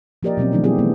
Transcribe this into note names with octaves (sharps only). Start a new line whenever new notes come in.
F3 A#3 G4 A#4 D5 D#5
B2 F#3 C4 C#4
D#3 F3 A3 D4 D#4
G3 B3 C4 E4 G4 G#4
E3 A3 B3